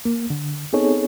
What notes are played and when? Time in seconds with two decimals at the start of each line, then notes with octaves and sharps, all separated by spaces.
0.05 A#3
0.30 D3
0.73 B3 C4 D#4 G#4 A4 C#5